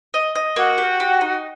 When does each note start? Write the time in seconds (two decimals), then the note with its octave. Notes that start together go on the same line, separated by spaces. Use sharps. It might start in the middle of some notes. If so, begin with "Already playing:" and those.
0.14 D#5
0.35 D#5
0.56 A#3 F#4
0.78 G4
1.00 G4
1.21 D#4